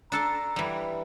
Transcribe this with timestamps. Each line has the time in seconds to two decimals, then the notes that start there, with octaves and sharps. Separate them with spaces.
0.12 D4 A4 A5 A#5
0.56 E3 G3